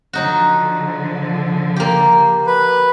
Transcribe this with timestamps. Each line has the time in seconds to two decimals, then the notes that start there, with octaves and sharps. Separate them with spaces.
0.13 D3 F3 F#3 D#4 F#4
1.76 A#3 G4
2.46 B4